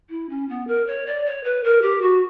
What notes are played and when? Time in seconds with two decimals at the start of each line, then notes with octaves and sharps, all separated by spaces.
0.09 E4
0.30 C#4
0.49 B3
0.67 A#4
0.87 C#5
1.06 D5
1.25 C#5
1.44 B4
1.64 A#4
1.82 G4
2.02 F#4